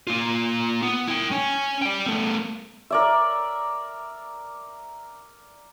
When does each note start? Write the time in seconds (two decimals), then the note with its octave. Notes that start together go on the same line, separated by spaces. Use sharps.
0.07 A#3 F4
0.82 B3
1.08 E4 G5
1.31 C#4 G#5
1.82 D5 G5
2.06 A3 B3
2.90 A#4 D5 E5